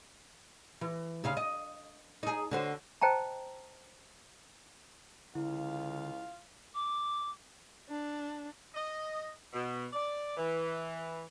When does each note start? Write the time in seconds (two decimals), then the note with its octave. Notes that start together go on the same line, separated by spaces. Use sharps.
0.81 E3
1.24 D2 C#3 F5
1.37 D#5
2.23 D#4 G#4
2.51 D3 F#4 C5
3.02 C5 D#5 G5 A5 A#5
5.35 C#2 D3 E4 F4 F5
6.74 D6
7.89 D4
8.75 D#5
9.53 B2
9.93 D5
10.37 E3